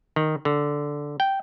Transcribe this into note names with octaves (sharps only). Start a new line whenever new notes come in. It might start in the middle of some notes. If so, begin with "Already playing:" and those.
D#3
D3
G5